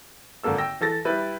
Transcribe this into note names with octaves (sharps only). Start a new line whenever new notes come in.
G#1 D3 A#3 A4 E6
G5 E6 A#6
E3 A4 A6 A#6
G3 E4 B4